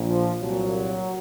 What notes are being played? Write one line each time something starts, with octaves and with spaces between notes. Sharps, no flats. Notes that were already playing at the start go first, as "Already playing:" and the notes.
Already playing: A#1 A#2
F3
C2 A#2 F#3